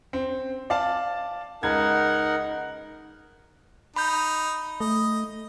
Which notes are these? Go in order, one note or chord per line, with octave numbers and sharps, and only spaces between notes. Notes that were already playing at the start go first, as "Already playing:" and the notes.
C4
D5 F5 A5
C#2 D#4 A#4 F#5 G#6
D#4 B5 G6
A3 D#5